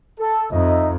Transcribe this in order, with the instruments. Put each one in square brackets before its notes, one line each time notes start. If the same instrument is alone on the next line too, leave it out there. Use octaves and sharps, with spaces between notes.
[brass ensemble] A4
[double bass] F2 [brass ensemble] D#4 D#5 E5